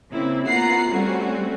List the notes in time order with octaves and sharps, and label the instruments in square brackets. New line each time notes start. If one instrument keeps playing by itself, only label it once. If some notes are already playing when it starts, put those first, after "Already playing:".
[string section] C#3 A#3 C4 E4
A#3 B3 F4 F#5 A#5 C7
G3 A3 C4 C#4 F#4